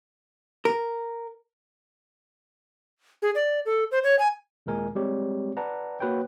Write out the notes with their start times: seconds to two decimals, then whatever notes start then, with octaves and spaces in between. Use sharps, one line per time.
0.65 A#4
3.22 G#4
3.35 D5
3.66 A4
3.91 C5
4.04 C#5
4.19 G#5
4.66 D#2 A#2 G#3 A#4 G#5
4.95 G3 G#3 C4 G4 C#5
5.57 B4 D5 F#5 A5 A#5
6.00 A#3 F#4 B4 C#5 G5